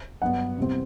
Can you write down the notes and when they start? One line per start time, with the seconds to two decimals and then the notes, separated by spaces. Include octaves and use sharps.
0.22 G2 F#3 B3 D4 F#5
0.58 E2 C3 G3 C4